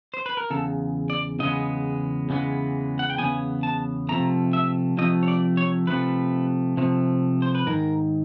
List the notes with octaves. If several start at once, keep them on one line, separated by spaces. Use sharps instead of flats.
C5
B4
A#4
E2 C#3 A4
D5
E2 C#3 G#3 B3 D#5
E2 C#3 E3 G#3 B3
F#5
G5
E2 C#3 B3 G#5
A5
C3 F3 A3 A#5
E5
C3 F3 A3 D#5
C#5
D5
C#5
C3 F3 A3 B4
C3 F3 A3
C5
B4
G#2 D#3 A#4